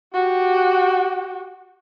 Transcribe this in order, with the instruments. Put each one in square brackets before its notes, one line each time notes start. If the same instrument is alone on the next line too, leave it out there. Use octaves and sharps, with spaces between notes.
[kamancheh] F#4 G4